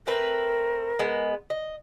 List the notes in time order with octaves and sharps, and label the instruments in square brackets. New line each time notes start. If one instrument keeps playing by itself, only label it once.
[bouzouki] A3 C4 B4 [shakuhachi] A#4
[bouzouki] G#3 B3
D#5